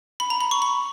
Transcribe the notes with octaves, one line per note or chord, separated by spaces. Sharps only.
B5
A#5
B5
C#6
B5